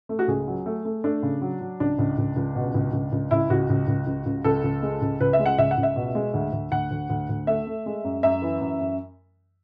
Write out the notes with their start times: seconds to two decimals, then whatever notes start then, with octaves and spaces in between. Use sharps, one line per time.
0.09 A3
0.19 F#4
0.28 C#2 G#4
0.48 F#3
0.66 A3
0.85 A3
1.04 A3 D4
1.23 C#3
1.42 F#3
1.61 F#3
1.80 C#2 D4
1.99 C#2
2.18 C#2
2.36 C#2
2.55 B2
2.74 C#2
2.93 C#2
3.12 C#2
3.31 C#2 E4
3.50 C#2 F#4
3.70 C#2
3.88 C#2
4.07 C#2
4.26 C#2
4.44 C#2 A4
4.64 C#2
4.83 G#3
5.02 C#2
5.20 C#2 B4
5.33 E5
5.39 G#3
5.46 F#5
5.58 C#2 E5
5.71 F#5
5.78 C#2
5.83 E5
5.96 B2
6.15 G#3
6.34 D2
6.53 D2
6.72 D2 F#5
6.91 D2
7.10 D2
7.29 D2
7.47 A3 E5
7.67 A3
7.86 G#3
8.04 F#2
8.23 F#2 E5
8.42 E3
8.61 F#2
8.80 F#2